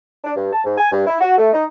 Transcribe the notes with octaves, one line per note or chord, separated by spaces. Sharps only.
D4
G2
A5
G#2
G#5
G2
E4
F#4
A3
D#4